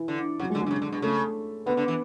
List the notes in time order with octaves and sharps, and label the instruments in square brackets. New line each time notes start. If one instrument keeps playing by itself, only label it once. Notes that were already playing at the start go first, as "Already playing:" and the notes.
Already playing: [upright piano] E3 E4
[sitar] D3
[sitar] C#3 [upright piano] F#3 F#4
[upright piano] G#3 G#4
[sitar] D3
[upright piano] G#3 G#4
[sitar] D3
C#3
D3
B2
[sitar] C#3 [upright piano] A3 A4
[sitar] D3 [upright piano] B3 B4
[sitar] D3
E3